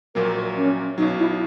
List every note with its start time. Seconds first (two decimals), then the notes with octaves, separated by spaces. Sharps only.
0.15 A#1 A#2 F#3 A#3 A#4
0.57 C#4
0.98 B1 B2 F#3 D#4
1.19 E4